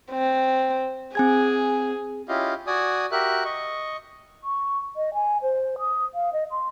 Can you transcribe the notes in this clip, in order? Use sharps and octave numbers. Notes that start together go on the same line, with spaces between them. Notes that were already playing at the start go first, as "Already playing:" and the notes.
C4
C4 G#4 G#5 G#6
C#4 E4 F4 G4 D#5 F5
F#4 D5 G#5 D#6
F#4 G4 A#4 E5 F#6
D#5 C#6
C#6
D#5
G#5
C5
D#6
F5
D#5
C6